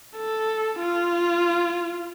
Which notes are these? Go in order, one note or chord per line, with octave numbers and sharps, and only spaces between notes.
A4
F4